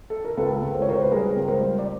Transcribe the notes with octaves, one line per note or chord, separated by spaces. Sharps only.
A4
A#4
C#2 A4 B4
C#2
C5
C#5
C#2 A#4 C5
B4
G3 G#4 A#4
C#2
A#4 C5
G3
D5